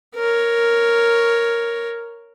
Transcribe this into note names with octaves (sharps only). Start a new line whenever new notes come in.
A#4 C#5